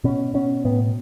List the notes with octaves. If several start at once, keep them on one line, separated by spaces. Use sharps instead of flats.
B2 C#4
B2 C#4
A2 B3